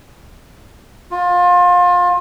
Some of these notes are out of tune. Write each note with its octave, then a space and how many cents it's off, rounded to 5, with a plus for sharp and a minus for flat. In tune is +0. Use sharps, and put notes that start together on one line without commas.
F4 +30